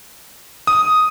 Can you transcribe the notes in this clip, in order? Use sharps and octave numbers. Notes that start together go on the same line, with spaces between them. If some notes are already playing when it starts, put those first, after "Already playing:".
D#6